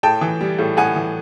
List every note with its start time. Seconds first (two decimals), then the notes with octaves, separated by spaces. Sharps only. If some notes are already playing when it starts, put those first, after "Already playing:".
0.03 A2 G5 A5
0.21 E3
0.41 G3
0.59 A2
0.77 A2 F#5 G#5
0.96 E3